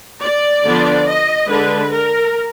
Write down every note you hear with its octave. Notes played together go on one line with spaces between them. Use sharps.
D5
D3 F3 B3 D4
D#5
D3 G#3 D4 B4
A#4